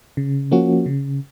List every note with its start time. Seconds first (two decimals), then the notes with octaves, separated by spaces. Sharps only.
0.17 C#3
0.51 F3 A#3 C#4 F#4
0.86 C#3